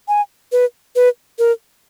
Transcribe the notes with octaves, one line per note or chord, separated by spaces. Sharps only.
G#5
B4
B4
A#4